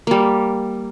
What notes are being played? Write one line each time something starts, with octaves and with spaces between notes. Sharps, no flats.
G3 A#3